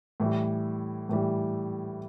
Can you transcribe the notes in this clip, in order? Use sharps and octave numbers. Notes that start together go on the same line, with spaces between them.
A2 E3 G3
A2 E3 G3